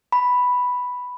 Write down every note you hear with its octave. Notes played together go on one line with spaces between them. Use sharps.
B5